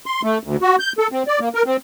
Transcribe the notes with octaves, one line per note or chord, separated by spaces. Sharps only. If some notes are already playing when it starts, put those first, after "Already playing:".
C6
A3
D2
F#4
G6
A4
C4
D5
A#3
A#4
C4